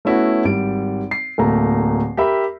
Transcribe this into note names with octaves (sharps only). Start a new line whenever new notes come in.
A3 B3 C#4 E4 F#4
G#1 G3 D7
C7
D1 A3 A#3 A#5
G4 A#4 E5 B5